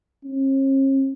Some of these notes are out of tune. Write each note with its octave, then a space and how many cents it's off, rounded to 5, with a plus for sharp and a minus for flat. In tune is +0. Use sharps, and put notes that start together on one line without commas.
C#4 -45